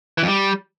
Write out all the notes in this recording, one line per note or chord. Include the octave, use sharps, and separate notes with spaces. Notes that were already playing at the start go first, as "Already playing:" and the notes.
E3
F2
G3